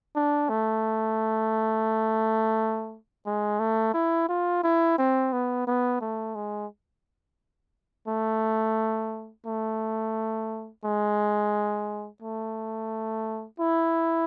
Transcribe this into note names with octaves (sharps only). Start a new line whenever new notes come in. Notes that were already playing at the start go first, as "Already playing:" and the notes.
D4
A3
G#3
A3
E4
F4
E4
C4
B3
B3
A3
G#3
A3
A3
G#3
A3
E4